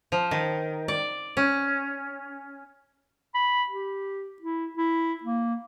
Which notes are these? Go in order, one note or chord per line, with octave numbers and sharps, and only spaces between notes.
F3
D#3
D5
C#4
B5
G4
E4
E4
A#3